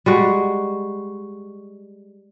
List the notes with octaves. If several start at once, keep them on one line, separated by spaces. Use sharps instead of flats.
G3 G#3 F#4